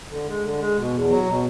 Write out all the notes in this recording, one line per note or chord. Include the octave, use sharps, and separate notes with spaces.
D3
G#3
D3
G#3
B2
E2
F#3
B2